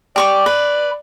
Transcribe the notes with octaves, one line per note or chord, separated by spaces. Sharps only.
G4 D5 C#6 D6
B4